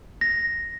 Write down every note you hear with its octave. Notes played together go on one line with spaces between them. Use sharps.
A#6